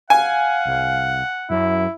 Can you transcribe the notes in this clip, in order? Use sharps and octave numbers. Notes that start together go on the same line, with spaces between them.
F5 F#5 G#5
C2
F#2 E4